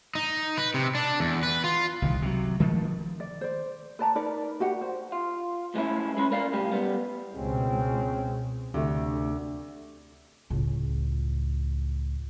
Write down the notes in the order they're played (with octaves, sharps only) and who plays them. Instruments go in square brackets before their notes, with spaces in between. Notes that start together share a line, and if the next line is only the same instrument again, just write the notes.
[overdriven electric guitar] D#4
B4
C3
D4
E2
B4
F4
[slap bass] C2 D#3
C3 F#3
D#3 F3 A3
[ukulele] D5
C5 D5
B4 D5 A5 A#5
D#4 A#4 B4 D5
F#4 G4 F#5
C5
[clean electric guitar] F4
A2 E3 G#3 C4 C#4 E4
G#3 C#4 B5
A#4 D5 F5
C2 A2 G#3 G4
G3 B3
[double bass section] C#2 B2 [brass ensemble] G#3 C4 C#4
[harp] D2 [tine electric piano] C3 A3
[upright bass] C#2 A2